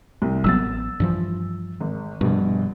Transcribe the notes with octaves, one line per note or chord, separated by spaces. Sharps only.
C2
A1 F#3 B3 E6 A6
G2 E3 F3
G#1
A#1 G2 B2